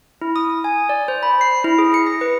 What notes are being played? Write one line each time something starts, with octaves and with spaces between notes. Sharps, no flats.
E4
D#6
G#5
D5
C5
B5
C7
E4
G#4
C#7
A#6
B4